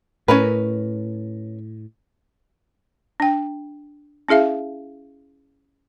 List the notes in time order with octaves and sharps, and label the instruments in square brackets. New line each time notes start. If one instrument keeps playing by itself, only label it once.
[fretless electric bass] A2 [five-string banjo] C#4 A#4 B4
[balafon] D4 G5
C#4 E4 G#4 E5 F5